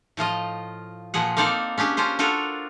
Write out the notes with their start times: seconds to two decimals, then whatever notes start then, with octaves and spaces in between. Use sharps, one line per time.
0.17 A2 F3 F4 D#5
1.14 A#2 F3 G#4 F#5
1.37 A#3 C4 D#4 A4 D5 F5
1.78 C#4 D4 G4 G#4
1.97 C#4 D4 F4 C5
2.19 D4 F4 F#4 A4 A#4